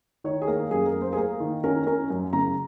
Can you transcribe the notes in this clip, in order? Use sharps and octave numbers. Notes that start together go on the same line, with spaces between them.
D#3 C#5
G#4
A#3 A#4
F#2 G#4
A#4
A#3
C5
G#4
A#3 A#4
D#3
C#4 A#4
C#4 A#4
F#2
C#3 A#5